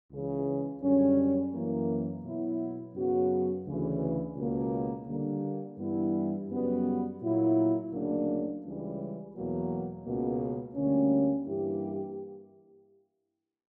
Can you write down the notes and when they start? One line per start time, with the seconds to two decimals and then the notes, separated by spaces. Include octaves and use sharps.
0.11 C#2 C#3 E3
0.82 F#2 D3 G3 C#4
1.53 F#2 E3 A#3
2.23 B2 F#3 B3 E4
2.95 F#2 C#3 F#3 B3 F#4
3.66 D2 C#3 E3
4.36 C#2 B2 A#3
5.07 D3 G3 A#3
5.78 G2 E3 G3 B3 E4
6.50 F#2 C#3 G3 B3 F#4
7.21 A#2 F#3 A#3 E4
7.91 D2 C#3 F#3 A#3 D4
8.63 C#2 C#3 E3 G3
9.34 E2 B2 F#3 A#3
10.04 C#2 B2 A#3
10.75 D2 D3 G3 A#3 C#4
11.46 G2 E3 A#3 E4 G4